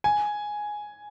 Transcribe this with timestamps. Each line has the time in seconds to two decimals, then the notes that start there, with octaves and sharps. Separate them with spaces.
0.04 G#5